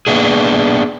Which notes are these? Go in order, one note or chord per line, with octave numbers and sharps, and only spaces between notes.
A#3 B3 D4 G#4